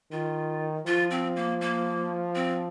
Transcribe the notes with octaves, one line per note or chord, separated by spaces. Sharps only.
D#3 F4
F3 F4
C4
A#3
A#3
C4